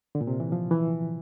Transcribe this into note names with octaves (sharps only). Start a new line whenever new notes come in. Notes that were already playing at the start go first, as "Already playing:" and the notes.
D3
A#2
C3
E3
F3
E3